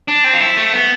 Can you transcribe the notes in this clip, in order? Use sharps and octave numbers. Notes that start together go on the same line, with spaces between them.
D4
C4
F4
E4
A3
B3